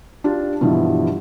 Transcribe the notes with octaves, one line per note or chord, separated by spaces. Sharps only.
D4 F4 G4
G2 B2 E3 F3